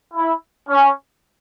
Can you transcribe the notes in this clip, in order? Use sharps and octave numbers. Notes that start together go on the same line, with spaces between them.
E4
C#4